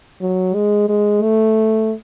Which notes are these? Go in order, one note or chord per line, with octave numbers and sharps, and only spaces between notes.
F#3
G#3
G#3
A3